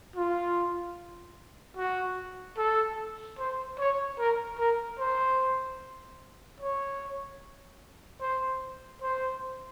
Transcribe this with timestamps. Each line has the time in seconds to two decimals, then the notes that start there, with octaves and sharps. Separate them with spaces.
0.16 F4
1.77 F#4
2.58 A4
3.39 C5
3.79 C#5
4.19 A#4
4.59 A#4
4.99 C5
6.61 C#5
8.21 C5
9.02 C5